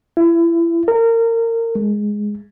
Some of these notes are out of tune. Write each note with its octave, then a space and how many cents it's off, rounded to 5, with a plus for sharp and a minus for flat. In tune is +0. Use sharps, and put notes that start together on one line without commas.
E4 +30
A#4 -25
G#3 +0